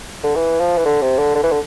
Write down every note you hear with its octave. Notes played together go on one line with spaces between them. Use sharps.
D3
E3
F3
E3
D3
C3
D3
D3
E3
D3